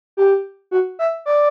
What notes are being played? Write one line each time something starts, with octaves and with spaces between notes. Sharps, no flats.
G4
F#4
E5
D5